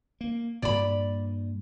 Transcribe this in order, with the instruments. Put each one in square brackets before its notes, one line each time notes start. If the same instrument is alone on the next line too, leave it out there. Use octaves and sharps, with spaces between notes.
[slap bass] A#3
[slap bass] G2 A#2 [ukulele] D5 B5